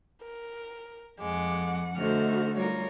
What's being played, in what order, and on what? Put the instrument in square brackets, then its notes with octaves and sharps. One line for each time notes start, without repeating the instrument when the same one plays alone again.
[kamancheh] A#4
[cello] F2 F#5 [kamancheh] G#3 D6
[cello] D3 [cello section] A3 D#4 F#4 [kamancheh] C5 F6
[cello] G3 A#4 [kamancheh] F4 C#5